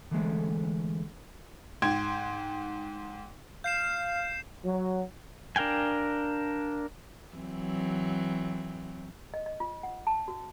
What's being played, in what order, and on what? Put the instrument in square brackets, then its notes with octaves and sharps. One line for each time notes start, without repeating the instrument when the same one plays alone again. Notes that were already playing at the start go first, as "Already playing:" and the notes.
[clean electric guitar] D3 E3 G#3 A3
[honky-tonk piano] G#2 G5 C6 G#6
[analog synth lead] F5 [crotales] G6 C7 E7
[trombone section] F#3
[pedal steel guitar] D4 A#4 F5 G5 G#5
[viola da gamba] E3 F#3 C4
[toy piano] D#5
D#5
F4
F#5
A5
F#4